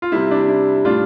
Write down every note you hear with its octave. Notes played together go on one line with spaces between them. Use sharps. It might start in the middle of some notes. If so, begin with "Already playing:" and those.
F4
C3 G3 E4
D4
E4
A2 G3 D4 F4